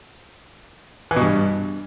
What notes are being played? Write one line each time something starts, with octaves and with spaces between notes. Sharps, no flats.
E3
B2
G2